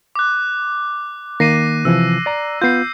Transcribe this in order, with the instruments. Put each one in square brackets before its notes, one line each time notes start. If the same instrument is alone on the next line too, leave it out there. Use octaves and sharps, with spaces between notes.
[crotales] D6 F#6
[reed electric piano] D#3 A#3 [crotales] A#6 C7 D#7
[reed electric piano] C3 E3 F3 [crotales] E6
[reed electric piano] D5 A#5
[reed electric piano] B3 F4 [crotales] G6 C7